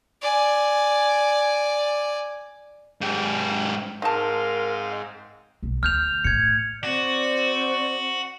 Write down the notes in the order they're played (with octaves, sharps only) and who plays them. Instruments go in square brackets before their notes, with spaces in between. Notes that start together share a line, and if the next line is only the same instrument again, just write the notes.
[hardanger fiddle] D5 G#5
[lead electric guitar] G#2 G4
[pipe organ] G#2 C4 [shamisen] D#4 A5 [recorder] A#4 [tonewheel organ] D#5 F5
[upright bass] B1
[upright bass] D2 [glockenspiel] F6 G6 F7
[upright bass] A2 [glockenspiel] G#6 C#7
[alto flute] C4 [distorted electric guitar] F#4 [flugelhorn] D5